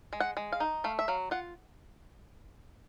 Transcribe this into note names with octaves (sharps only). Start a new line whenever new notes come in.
G#3
F#5
G#3
F5
D#4
A3 F5
E5
F#3 F5
F4 F#5